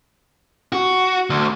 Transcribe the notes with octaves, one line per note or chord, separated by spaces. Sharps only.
F#4
D2